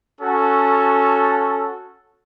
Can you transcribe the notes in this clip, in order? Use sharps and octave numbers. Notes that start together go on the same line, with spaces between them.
C#4 F#4 A4